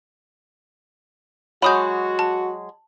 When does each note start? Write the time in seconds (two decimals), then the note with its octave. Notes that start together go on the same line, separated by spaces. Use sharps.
1.62 F#3 G#3 F#4 B5 D#6 G6
2.19 A5